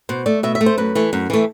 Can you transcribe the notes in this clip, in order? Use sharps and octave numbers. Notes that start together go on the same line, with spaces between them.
B2 C5
A3 D5
B2 E5
E5
A3
C5
F#2 B4
E3 A3
F#2
E3 A3